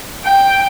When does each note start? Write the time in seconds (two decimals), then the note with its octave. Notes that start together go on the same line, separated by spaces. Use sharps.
0.24 G5